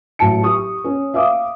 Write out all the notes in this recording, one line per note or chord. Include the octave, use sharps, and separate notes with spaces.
A1 F#3 A5 C#7
G4 C#6 D#6
C#4
E5 F5 D6 D#6